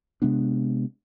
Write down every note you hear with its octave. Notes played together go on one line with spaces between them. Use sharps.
C3 G#3 B3 D4